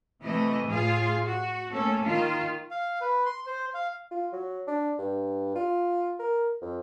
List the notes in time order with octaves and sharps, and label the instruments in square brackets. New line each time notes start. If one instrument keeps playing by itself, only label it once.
[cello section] C3 E3 A3 D#5
A2 F4 G#4 F5
F#4
A3 A#3 C#4 A4
D#3 F4
[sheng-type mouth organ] F5
B4
C6
C5
F5
[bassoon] F4
F#3
D4
G2
F4
A#4
F2